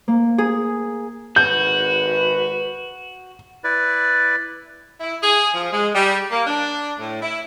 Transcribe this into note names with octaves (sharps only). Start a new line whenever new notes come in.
A#3
G#4
G#1 F#4 B4 G6
E4 B4 D5
E4
G#4
F3
G#3
G3
A#3
D4
A2
E4